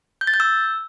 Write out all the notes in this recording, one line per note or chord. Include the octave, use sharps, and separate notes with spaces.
G6
A6
G6
E6